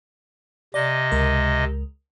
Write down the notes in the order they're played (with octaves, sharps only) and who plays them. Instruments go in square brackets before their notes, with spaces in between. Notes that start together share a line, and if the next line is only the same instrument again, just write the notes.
[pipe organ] C3 D#5 [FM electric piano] D5
[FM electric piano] C#2 G#3 A#4